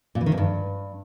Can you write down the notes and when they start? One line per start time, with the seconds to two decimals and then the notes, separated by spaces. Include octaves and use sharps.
0.15 A#2
0.21 E3
0.26 D#3
0.32 E2
0.38 G2